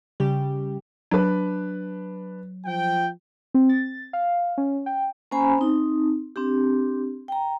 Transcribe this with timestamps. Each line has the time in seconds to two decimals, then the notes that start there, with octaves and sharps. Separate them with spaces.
0.20 C#3 G3 G4
1.11 F#3 D4 B4
2.66 F3 G5
3.54 C4
3.69 A6
4.13 F5
4.58 C#4
4.86 G5
5.31 A#3 C#4 C5 G#5 A#5 B5
5.58 C4 D#4
6.36 C4 D4 G4
7.28 G5 A#5